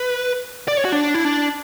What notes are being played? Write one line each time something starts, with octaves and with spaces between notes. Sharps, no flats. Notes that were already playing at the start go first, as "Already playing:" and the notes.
Already playing: B4
D5
C#5
F#4
D4
E4
D4